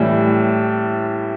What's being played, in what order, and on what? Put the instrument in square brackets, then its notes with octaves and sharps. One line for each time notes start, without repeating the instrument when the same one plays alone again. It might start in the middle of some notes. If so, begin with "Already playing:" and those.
Already playing: [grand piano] A2 E3 G3